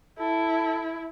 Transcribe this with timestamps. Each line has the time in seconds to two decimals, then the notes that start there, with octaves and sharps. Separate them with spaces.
0.19 E4 A4